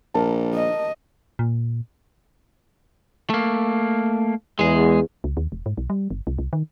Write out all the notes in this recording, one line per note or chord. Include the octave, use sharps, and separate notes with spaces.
A#1 A#4 A5
D#5
A#2
A3 A#3
E2 G#3 G#4
C#2
D#2
E1
G#2
B1
G3
G1
C2
C2
D#3